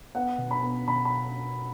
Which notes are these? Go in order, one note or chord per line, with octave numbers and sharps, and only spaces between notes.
B3 F#5
B2
B5
B3
B2 B5
B5